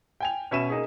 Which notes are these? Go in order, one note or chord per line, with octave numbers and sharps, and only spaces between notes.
G5 G#5 F7
B2 C#4 E5 B5 D#7 E7
A#3 D#4 G#4